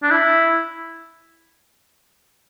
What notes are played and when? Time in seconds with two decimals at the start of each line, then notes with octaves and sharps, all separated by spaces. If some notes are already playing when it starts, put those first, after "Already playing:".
0.03 D4
0.11 E4